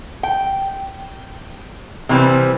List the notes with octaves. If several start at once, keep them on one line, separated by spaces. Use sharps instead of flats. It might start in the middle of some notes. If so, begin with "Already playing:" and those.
G5
C3 E3 G3 C4